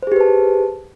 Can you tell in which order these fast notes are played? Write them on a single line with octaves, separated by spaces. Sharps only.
C5 G#4 G4 B4 A5